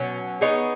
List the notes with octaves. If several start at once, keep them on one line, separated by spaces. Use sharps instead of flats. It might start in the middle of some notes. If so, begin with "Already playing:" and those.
Already playing: B2 F#3 C#4
B3 D#4 G#4 C#5